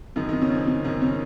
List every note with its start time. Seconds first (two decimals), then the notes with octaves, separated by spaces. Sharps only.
0.16 F#2 D#3 D#4
0.29 F#2 D#3 D#4
0.42 C#3 C#4
0.50 F#2 C4
0.67 C#3 C#4
0.84 F#2 D#3 D#4
1.02 C#3 C#4